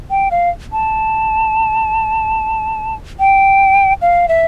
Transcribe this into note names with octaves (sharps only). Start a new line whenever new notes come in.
G5
F5
A5
G5
F5
E5